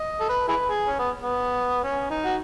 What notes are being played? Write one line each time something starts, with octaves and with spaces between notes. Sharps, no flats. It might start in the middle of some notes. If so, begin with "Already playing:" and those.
Already playing: D#5
A4
B4
E4 G#4 B4
G#4
C#4
B3
B3
C#4
D#4
F#4